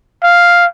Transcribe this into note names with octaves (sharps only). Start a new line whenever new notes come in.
F5